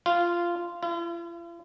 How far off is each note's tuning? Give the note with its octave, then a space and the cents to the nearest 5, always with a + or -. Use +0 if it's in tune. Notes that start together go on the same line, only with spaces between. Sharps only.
F4 -10
F4 -45